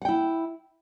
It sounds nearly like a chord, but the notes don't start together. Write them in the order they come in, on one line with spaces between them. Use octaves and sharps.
F#5 G5 E4